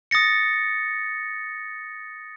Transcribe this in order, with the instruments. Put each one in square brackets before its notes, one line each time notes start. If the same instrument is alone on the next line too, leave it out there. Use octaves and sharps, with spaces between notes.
[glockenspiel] D#6 A6 A#6 C#7